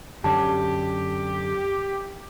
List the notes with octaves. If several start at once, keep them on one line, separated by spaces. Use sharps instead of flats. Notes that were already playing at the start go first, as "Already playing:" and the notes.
F#2 D3 C#4 G4 A5